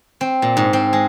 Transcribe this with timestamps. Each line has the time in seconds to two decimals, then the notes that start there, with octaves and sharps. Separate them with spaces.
0.21 C4
0.42 A#2
0.57 G#2
0.73 C4
0.93 G#3